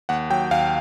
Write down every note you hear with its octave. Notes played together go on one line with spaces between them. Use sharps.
D#2 F#5
F#3 G5
D#2 F5